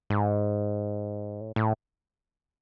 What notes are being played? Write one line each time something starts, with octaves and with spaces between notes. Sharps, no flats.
G#2
A2
A2